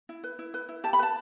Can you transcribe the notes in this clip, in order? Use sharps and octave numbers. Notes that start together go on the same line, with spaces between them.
E4
B4
E4
B4
E4
G4 A5
B5
B4 A5